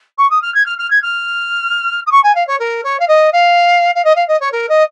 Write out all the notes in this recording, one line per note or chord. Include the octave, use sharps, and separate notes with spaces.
C#6
D#6
F6
G#6
F6
F6
G#6
F6
D#6
C#6
G#5
F5
C#5
A#4
C#5
F5
D#5
F5
F5
D#5
F5
D#5
C#5
A#4
D#5